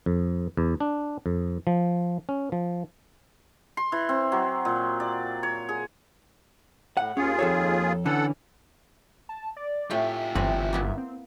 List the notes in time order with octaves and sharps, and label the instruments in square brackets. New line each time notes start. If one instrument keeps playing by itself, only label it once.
[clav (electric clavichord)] F2
E2
D4
F2
F3
C#4
F3
[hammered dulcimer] C6
E3
C4
F#3
A#2
D5
C#5
G#4
[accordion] A2 [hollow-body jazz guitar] F#5
[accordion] D#2 F4 G#4 [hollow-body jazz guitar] C#4
[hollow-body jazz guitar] F2 A4 C#5
[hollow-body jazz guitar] D3 E3 C#4 [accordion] A4 F#5
[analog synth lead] A5
D5
[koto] A2 A3 G5 [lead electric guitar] F4 G4 [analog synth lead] E5
[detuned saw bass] G1 [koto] E3 C4 F#5
[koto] A#3 B3 E4
[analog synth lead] C4